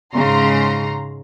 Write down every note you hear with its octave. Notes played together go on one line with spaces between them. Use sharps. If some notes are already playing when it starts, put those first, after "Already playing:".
G#2 C#3 A#5 C6